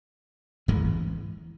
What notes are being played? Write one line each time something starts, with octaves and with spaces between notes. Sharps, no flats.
A1 G#2 E3 G#3